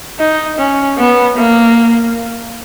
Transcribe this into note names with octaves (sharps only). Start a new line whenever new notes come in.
D#4
C#4
B3
A#3